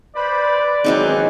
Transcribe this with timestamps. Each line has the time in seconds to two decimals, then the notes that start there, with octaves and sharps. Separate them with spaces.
0.16 B4 C5 D5 B5
0.84 G#2 D#3 E3 F#3 C4 D#4 G#4 F#6